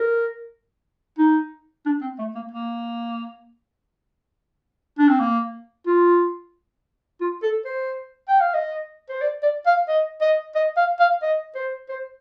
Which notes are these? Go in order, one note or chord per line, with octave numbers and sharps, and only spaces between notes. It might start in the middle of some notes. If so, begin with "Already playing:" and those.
Already playing: A#4
D#4
D4
C4
A3
A#3
A#3
D4
C4
A#3
F4
F4
A4
C5
G5
F5
D#5
C5
D5
D5
F5
D#5
D#5
D#5
F5
F5
D#5
C5
C5